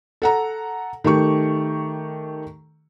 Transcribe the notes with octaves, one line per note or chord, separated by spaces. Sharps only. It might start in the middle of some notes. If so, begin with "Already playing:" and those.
A4 F#5 A#5
D#3 A3 G4 C#6